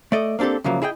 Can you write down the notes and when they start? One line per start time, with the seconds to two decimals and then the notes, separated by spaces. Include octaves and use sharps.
0.12 A3 D5 D#5
0.39 A#3 C4 D4 G4 A4
0.64 D2 C#3 F3 F#3 A#3
0.82 E4 G#4 D#5 G5